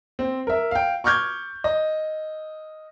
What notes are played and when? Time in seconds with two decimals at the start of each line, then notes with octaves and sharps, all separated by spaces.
0.19 C4
0.47 A#4 E5
0.71 F5 G5
1.04 C#6 D6 F6 G6 G#6
1.64 D#5